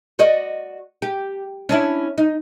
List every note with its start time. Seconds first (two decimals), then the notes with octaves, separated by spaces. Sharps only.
0.19 F#4 D5 D#5
1.02 G4
1.69 C#4 D4 E4
2.18 D#4